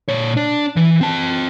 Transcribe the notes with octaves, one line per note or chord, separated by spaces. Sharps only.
A#2 C#5
D4
E3
C4 A5